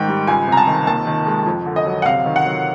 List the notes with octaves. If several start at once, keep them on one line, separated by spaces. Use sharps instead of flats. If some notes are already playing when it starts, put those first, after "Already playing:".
Already playing: G#2 D#3 G5
G3
C#2 G#5
C3 A#5
A5
D#3
D#2 A5
D#3
G#3
F2
D3
D#5
F#3
F#5
C3 F5
D#3
F#5
F#3